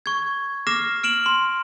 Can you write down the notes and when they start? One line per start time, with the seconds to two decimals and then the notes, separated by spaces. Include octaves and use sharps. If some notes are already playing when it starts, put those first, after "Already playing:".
0.06 C#6 G#6
0.67 D6 F6 A#6 C7 E7
1.03 F6 D7 E7 F#7
1.26 C6